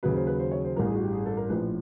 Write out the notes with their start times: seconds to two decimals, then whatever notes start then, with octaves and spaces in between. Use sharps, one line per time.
0.03 D#2 C#3 F#3 B4
0.15 C5
0.27 B4
0.39 C5
0.51 C#5
0.64 C5
0.76 A1 G2 E3 A#4
0.86 G#4
0.95 F#4
1.04 G4
1.13 G#4
1.26 A4
1.37 A#4
1.49 A#1 A2 F3 B4